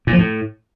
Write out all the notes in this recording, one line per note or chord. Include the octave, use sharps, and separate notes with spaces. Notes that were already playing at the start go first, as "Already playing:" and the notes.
A#2
F3
A2